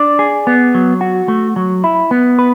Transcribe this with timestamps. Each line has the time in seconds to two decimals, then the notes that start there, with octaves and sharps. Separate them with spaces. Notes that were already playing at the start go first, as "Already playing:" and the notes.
Already playing: D4 D5
0.19 G#4
0.47 B3
0.75 F#3
1.01 F#4
1.28 A3
1.56 F#3
1.84 E4
2.11 B3
2.39 B4